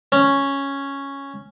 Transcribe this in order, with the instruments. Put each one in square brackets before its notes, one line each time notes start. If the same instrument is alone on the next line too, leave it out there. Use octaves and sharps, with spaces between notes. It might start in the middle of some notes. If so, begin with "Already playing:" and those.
[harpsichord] C#4